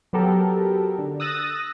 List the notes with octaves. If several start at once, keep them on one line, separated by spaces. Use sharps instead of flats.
F#3 B3 G4 A4 A#4
D3
D#6 E6 F#6 A6 A#6 D#7